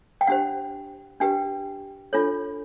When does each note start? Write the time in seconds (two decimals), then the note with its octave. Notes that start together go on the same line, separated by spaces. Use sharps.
0.21 G5
0.27 D4 G4 C5 F#5
1.20 D4 G4 B4 G5
2.13 D4 F4 A4 C#5